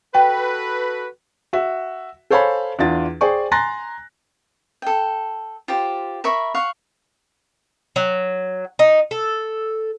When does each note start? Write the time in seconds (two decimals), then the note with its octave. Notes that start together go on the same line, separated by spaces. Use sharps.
0.15 F#4 A4 B4 G5
1.53 F#4 E5
2.30 A4 C5 C#5 F5 G#5 B5
2.79 E2 D4 F4 A6
3.21 G#4 C5 D5 G5 G#5 C#6
3.52 G#5 A#5 C6 F#6 A6 A#6
4.82 A4 G5
5.68 F4 G4 C5
6.24 A#4 E5 B5 C#6
6.54 F5 F#5 C#6
7.96 F#3
8.79 D#4
9.11 A4